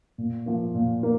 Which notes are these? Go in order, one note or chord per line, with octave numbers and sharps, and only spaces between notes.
A#2
F3 A#3
A#2
A#3